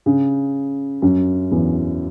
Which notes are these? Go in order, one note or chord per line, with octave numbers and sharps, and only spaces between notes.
C#3
F#2
E2